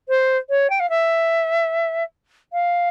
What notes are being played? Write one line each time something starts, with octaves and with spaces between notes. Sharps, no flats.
C5
C#5
G5
F5
E5
F5